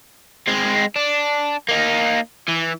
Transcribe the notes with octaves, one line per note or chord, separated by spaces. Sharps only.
G#3 C4
D4
A#3 D#4
E3